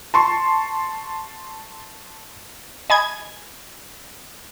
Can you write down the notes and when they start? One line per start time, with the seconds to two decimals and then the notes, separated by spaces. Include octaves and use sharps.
0.14 A5 C6 C#6
2.90 D#5 G#5 B5 G#6